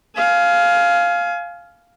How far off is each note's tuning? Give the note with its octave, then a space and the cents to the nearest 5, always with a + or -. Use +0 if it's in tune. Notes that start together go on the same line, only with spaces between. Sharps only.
F5 +0 G#5 +30